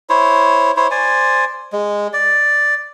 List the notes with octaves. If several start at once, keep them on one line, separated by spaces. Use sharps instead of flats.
E4 C5 C#5
E4 C5 C#5
C5 D5 G#5
G#3
D5